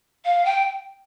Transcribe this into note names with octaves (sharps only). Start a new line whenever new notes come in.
F5
G5